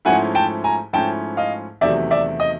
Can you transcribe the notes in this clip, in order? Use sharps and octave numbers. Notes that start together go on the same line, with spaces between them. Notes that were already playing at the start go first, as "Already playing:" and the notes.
G#2 F3 A3 C#4 E4 F#5 G#5
G5 A5
G#5 A#5
G#2 F3 A3 C#4 E4 G5 A5
D#5 F5
E2 C3 D#3 F#3 A3 D5 E5
D5 E5
D#5